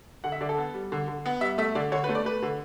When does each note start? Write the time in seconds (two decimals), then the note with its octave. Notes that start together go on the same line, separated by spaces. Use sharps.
0.24 D3 F#5
0.32 E5
0.41 D3 D5
0.49 A4
0.58 B3
0.74 G3
0.92 D3
1.08 D3
1.26 B3
1.41 G3 E5
1.58 A3 E5
1.75 D3 D5
1.92 D3 C#5
2.04 B4
2.09 A3
2.15 D5
2.25 A3 B4
2.42 D3